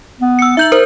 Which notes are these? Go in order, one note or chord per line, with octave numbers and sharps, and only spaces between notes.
B3
E6 C#7
D#4 E5 G6 F#7
A#4 C5